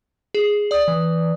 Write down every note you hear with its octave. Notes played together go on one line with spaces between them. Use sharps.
G#4
D5 D#6
E3